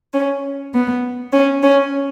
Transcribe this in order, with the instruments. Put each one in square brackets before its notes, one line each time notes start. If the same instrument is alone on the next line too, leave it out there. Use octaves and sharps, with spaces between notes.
[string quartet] C#4
B3
C#4
C#4